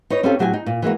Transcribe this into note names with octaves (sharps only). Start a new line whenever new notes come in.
D#4 B4 C#5 D#5
C4 C#4 D#4 F4 G4 A4
A2 F#3 G4 F5 G#5
D#4
A#2
E3 G#3 A#3 F#4